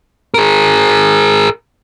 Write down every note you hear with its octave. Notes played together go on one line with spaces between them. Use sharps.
G#4 A#4